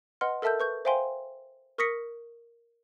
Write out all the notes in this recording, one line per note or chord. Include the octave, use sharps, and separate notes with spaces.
B4 D#5 F#5 C6 F6
A4 A#4 E5 A5 E6 G6
B4 C#6 G6
C5 E5 F5 G5 G#5 C6
A#4 C#6 D#6 A#6 B6 C#7